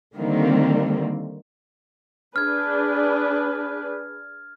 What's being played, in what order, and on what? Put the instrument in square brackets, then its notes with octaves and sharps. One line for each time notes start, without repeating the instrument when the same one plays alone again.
[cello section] D3 D#3 G3 A#3 C4
[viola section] D4 G#4 B4 [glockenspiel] F6 G#6